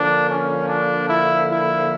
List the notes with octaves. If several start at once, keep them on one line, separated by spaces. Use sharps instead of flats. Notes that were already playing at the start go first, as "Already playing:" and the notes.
Already playing: D3 F3 A#3 D4
C#4
D4
E4
E4